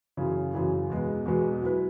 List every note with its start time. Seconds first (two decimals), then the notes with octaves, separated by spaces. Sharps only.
0.17 F#2 C#3 E3
0.54 F#2 C#3 E3
0.90 E2 B2 G#3 B3
1.26 E2 B2 G#3 B3
1.62 F#3 E4 B4